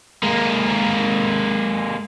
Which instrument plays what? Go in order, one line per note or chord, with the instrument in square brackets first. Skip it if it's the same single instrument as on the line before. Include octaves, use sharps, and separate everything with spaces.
[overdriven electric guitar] G#3 A#3